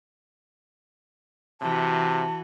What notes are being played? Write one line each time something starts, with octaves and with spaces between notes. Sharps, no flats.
C3 E3 F#4 A5